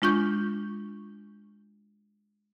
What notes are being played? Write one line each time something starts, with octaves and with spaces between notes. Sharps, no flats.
G#3 D4 F4 C#6 G6